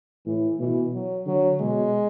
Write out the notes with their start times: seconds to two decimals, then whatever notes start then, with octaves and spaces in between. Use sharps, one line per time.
0.26 A2 E3
0.60 B2 E3
0.93 F#3
1.26 D3 F#3
1.60 B2 G#3